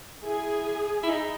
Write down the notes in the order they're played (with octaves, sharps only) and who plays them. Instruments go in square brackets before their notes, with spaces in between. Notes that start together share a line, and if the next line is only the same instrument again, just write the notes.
[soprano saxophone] E4 [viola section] G#4
[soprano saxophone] E4
D#4